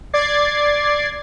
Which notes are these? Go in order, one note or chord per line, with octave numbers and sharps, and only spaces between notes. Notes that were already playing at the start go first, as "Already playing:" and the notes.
D5 D6 G#6 A6 C7